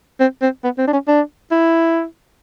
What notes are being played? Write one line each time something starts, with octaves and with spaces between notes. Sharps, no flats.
C4
C4
B3
C4
D4
C#4
D4
E4